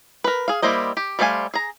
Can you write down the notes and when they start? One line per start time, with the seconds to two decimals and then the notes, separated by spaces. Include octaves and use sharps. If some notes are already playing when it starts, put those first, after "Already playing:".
0.24 A#4 B4
0.48 G#4 F5
0.62 G3 A#3 E4 C5 D#5
0.97 G4
1.19 G3 A3 C5 F5 G#5
1.54 G#4 A#5